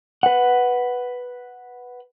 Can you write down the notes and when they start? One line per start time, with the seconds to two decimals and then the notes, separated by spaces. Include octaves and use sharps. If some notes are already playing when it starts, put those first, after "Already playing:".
0.23 B4 F#5